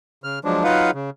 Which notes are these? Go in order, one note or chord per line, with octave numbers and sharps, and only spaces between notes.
C#3 F6
F3 F#3 G#3 D4
F#3 D#4 F4 B4 F5 F#5
C#3